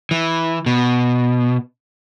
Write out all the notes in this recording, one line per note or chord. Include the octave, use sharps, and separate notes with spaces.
E3
B2